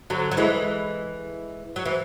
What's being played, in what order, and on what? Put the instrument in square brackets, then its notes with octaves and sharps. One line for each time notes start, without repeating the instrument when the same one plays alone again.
[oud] D3 F#3
F#3
E3 G#3
F#3
E3